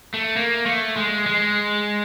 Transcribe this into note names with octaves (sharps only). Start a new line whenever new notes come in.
A3
A#3
A3
G#3
G#3